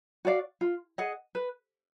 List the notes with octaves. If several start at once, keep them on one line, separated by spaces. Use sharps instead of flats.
F#4 D5 F5
F4
G#4 D#5 F#5
B4